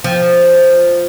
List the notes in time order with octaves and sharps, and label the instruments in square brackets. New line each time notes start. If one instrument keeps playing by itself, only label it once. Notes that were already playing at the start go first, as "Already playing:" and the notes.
[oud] F3